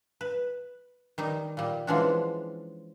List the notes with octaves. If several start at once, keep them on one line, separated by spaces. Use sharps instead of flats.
B4
D#3 G3 D#4
A#2 G3
E3 F3 G#3 C#4 D4 F#4